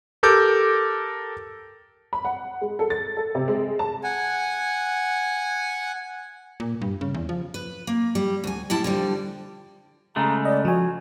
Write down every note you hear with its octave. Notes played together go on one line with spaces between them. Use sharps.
G4 A4 A#4 D6 G6
B5
F#5
G#3
A4
A6
A4
C3
G#3
A5
F#5 G#5
A#2
G2
C#3
E2
F3
B4
A#3
G3
D2 G#5
A2 G3 E4 A5
D3 F3 G3
C#3 G#3 A3 A#5
D5 D#5
F3 F#4 G#5